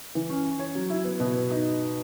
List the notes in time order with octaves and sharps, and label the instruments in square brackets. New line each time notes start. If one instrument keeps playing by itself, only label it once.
[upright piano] E3
C#4
C#4
C#5
F#3
E4
B3
B2
B3
D#4